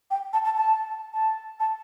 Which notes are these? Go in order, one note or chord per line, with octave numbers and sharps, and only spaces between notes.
G5
A5
A5
A5
A5
A5